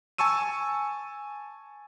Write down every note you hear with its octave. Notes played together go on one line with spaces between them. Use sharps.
G#5 A5 C#6 E6 D#7